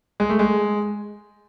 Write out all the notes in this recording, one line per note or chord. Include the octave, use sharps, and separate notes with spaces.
G#3
A3
G#3